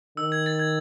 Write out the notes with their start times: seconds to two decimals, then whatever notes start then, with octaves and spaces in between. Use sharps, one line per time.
0.17 D#3 E6
0.32 G#6
0.46 A6
0.59 G#6